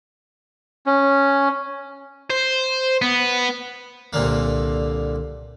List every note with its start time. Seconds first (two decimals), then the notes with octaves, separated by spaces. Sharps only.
0.86 C#4
2.30 C5
3.02 B3
4.13 C2 A#2 D3 A#3